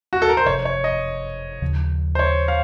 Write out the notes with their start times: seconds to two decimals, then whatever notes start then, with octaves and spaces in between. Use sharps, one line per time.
0.13 F#4
0.22 A4
0.29 A#4
0.37 C5
0.45 F#1 F2 C3 F3 C#5
0.65 C#5
0.84 D#5
1.62 D#2 C#3 F3
2.15 C5
2.19 C#5
2.48 F5